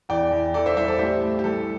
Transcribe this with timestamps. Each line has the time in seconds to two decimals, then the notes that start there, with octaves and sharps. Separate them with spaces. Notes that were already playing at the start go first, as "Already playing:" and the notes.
0.09 E2 D5 G5
0.32 E2
0.54 E3 A4 D5
0.66 C5 E5
0.77 C2 C5 E5
0.88 A4 D5
0.99 A2 G4 C5
1.22 A2
1.39 G4
1.44 C2 A4